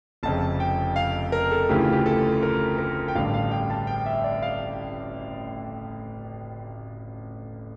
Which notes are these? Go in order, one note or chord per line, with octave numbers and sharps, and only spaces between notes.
F1 F2 C#3 A5
G5
F5
A#4
A4
D2 C#3 E3 G4
F4
G4
A4
A#4
A#4
G5
A1 G2 D3 F5
F5
G5
A5
G5
E5
D5
F5